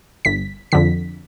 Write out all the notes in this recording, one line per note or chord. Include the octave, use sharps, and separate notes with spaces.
G1 B6
F2 D3 B6